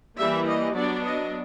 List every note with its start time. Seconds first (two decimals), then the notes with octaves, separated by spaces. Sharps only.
0.16 E3 G3 A#3 E5
0.46 D#5
0.74 F#3 B3 D4 D5
1.04 D#5